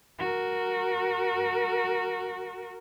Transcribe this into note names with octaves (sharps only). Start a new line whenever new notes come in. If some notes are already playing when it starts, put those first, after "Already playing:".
F#4 A#4